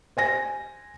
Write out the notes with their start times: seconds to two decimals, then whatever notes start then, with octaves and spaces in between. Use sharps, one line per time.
0.17 C5 G#5 A#6